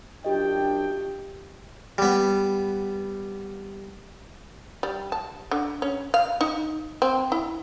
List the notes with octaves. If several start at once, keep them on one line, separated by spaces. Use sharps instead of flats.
F#2 D4 F4 G4 D#5 G5
G3 B3
G3
A5
D3
C#4
F5
D#4
C4
E4